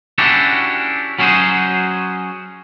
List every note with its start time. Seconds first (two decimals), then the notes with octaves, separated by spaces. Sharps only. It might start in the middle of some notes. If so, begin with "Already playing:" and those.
0.18 C#4 D4 E4 F#4 G4 A4
1.19 F#3 C#4 E4 F#4 G#4 C5